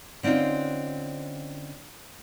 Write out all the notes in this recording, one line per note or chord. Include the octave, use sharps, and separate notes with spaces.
D3 C4 C#4 D#4 F4